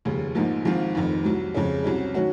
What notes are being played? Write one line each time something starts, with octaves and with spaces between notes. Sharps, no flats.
F1 D#2 C#3
A#1 G#2 F3 A#3 D#4
G#1 G#2 F3 C4 F4
F1 F2 D#3
C2 C3 F#3
F2 C#3 G#3 C#4
C2 C3 F#3 C#4
D#3 F#3 C#4 F#4